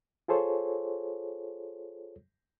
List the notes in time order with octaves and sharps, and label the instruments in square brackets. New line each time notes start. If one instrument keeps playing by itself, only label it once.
[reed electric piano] F4 G#4 A4 C5 C#5